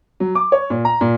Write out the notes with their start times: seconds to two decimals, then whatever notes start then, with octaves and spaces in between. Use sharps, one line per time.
0.20 F#3
0.35 D6
0.52 C#5
0.70 A#2
0.85 A#5
1.01 A#2